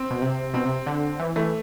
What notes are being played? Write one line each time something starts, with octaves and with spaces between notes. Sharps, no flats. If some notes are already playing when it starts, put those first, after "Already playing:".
Already playing: C4
B2
C3
B2 C4
C3
D3
E3
E3 A3